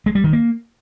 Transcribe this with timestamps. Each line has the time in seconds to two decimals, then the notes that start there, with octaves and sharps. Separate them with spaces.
0.06 G#3
0.15 G3
0.24 D#3
0.33 A#3